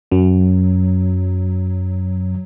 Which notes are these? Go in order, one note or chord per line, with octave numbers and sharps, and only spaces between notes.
F#2 F#3